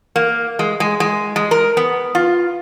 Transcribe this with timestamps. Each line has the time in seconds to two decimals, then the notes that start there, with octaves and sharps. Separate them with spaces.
0.16 A#3
0.59 G#3
0.80 G#3
1.00 G#3
1.36 G#3
1.51 A#4
1.77 B3
2.15 F4